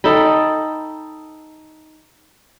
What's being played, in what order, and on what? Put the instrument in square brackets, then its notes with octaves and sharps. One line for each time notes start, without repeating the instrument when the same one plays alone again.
[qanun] D#4 A4 G5 B5